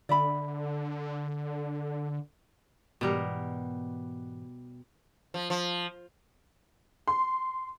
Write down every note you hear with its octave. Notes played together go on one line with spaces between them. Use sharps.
D3 D5 E5 B5
G#2 B2 E3 G3 B3 A#4
F3
F3
C6